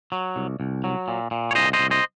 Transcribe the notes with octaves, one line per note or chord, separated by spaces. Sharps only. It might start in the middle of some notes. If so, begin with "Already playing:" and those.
F#3
C2
C2
F#3
A#2
A#2
C#5
C2 C5 D#5
C5 D#5
C2
C5 D#5